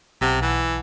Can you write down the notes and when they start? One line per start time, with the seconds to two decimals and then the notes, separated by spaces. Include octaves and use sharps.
0.21 B1 C3 F#5 A5
0.42 E3